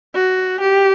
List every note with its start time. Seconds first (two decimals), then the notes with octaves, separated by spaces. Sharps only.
0.15 F#4
0.61 G4